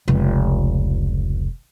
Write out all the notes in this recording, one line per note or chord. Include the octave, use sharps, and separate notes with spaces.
F1 C#2